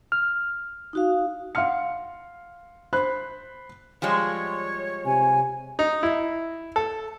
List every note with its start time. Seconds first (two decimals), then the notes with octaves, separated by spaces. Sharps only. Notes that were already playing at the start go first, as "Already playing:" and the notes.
0.12 F6
0.93 D#4 F#4 F5
1.55 F5 F#5 C6 F6 C#7
2.93 C5 B5 F#6
4.02 F3 G3 G#3 C#5
5.06 C3 G#5
5.79 D#4
6.03 E4
6.76 A4